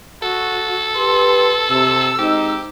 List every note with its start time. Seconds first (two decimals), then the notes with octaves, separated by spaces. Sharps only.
0.22 F#4 A4
0.95 G4 B4 C6
1.69 C3 E6
2.19 G#3 C4 D#4 G4